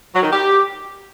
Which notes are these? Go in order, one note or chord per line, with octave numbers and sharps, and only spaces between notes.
F#3
D#3
G4